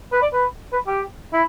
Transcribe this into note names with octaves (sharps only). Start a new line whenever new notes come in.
B4
D5
B4
B4
G4
E4